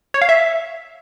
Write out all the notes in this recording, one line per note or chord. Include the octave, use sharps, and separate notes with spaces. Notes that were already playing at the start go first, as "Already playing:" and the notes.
C#5
F5
E5